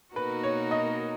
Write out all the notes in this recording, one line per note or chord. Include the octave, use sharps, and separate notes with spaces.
B2 A#3 D#4 F#4 A#4 B4
C#5
D#5